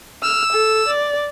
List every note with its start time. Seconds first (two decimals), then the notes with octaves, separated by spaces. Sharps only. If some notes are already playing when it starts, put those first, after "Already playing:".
0.23 E6 F6
0.52 A4
0.88 D5